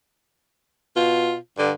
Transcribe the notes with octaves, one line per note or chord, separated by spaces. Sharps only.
B2 F4
G2 D3